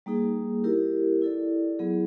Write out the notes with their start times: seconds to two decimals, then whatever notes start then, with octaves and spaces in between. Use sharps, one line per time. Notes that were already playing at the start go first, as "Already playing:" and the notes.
0.06 G3 A#3 D#4 G#4
0.64 E4 G4 A#4
1.22 E4 A4 D5
1.79 F#3 B3 E4 G#4